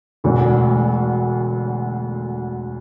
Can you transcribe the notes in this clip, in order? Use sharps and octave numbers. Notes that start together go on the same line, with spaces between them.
E1 D2 D3